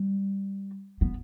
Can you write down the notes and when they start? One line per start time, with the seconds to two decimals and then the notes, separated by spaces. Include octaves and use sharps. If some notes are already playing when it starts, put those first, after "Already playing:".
Already playing: G3
1.01 B3